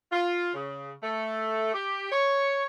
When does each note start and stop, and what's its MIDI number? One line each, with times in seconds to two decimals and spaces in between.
0.12 0.51 65
0.54 0.92 49
1.03 1.71 57
1.74 2.11 67
2.12 2.66 73